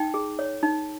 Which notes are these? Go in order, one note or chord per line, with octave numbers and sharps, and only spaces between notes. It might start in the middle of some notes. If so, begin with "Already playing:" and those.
Already playing: D#4 G5
G#4
C#5
D#4